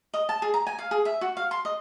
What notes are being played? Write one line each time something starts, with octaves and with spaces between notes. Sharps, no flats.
D#5
A5
G#4
A#5
G#5
F5
G#4
E5
F#4
F5
C6
D#5